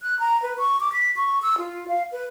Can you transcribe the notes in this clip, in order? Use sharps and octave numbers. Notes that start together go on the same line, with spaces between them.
F#6
A#5
B4
C#6
D6
B6
C#6
E6
F4
F5
B4